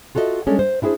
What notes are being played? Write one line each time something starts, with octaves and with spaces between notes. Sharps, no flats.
F4 F#4 A4 A#4 D#5 E5
G3 G#3 C#4 D4 A4
C5
D4 E4 G4 G#4 C5